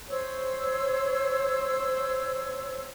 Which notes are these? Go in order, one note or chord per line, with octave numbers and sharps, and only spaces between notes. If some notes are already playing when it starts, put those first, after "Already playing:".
C5 C#5 E6